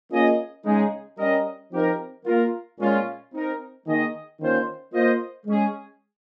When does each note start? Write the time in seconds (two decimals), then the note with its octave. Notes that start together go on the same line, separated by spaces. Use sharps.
0.11 A#3 C#4 F4 G#4 D#5
0.65 C#3 G#3 D#4 G#4
1.18 G3 C#4 G4 A#4 D#5
1.72 F3 C4 D#4 G4 A#4
2.25 A#3 F4 A#4
2.79 A#2 G#3 C#4 F4
3.33 C4 D#4 A#4
3.86 D#3 A#3 D#4 G#4 D#5
4.40 D#3 A#3 C#4 F4 C5
4.93 A#3 F4 C5 D#5
5.46 G#3 C#4 G#4